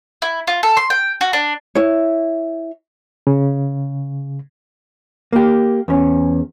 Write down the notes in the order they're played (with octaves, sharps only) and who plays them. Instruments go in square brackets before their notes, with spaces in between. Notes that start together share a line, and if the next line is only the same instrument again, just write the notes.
[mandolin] E4
F4
A4
C6
G5
F#4
D4
[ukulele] E4 C#5
[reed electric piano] C#3
[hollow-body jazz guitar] A#3 G4
E2 C#4